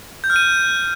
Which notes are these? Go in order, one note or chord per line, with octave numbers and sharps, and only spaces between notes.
G6
F6
D#7